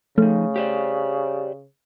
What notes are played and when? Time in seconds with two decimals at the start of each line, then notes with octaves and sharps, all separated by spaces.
0.18 C#3 F3 A3 D#4
0.56 G4 C5 D5